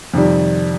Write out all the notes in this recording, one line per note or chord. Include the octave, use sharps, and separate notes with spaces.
F2 C3 D#3 G3